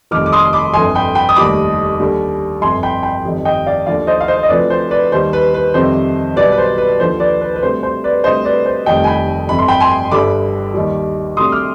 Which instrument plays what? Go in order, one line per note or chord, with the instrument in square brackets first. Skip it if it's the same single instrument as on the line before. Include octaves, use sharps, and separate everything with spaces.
[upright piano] F1 F2 D#3 G3 D6 F6
D6
C6 D#6
B5 D6
G1 F2 D3 G#5 C6
G5 B5
G5 B5
D#6
F1 D#2 D#3 G3 B5 D6
D#2 D3 G3
G1 F2 C3 G#5 C6
G5 B5
G5 B5
G1 F2 D#3 G3
D#5 G5
D5 F5
D#2 D3 F3 D5 F5
C5 D#5
F5
C5 D#5
D#5
D2 C3 F3 B4 D5
C5
B4 D5
D#2 D#3 G3 C5
B4
B4
F2 C3 D#3 G3 C5
B1 B2 G3 B4 D5
B4
C5
B4
D#2 D3 F3 C5
B4 D5
B4
B4
D2 C3 G3 C5
C5
B4 D5
D2 C3 G3 C5 D#5
B4 D5
C5
F1 F2 D#3 G3 D#5 G5
G#5
G5 B5
G1 F2 C3 B5
C6
G5 B5
G#5 C6
G1 G2 D3 G3 B5 D6
D#2 D#3 G3
D2 C3 G3 C6 D#6
D6 F6